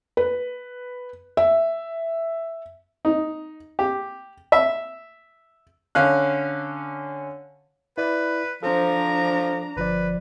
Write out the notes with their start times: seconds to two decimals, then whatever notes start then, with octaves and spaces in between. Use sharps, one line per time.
0.17 B4
1.37 E5
3.05 D#4
3.79 G4
4.52 E5
5.95 D3 C#4 F5 F#6
7.98 E4 B4 D5
8.63 F3 D4 A4 C5 A#5
9.77 G1 F3 B4 D5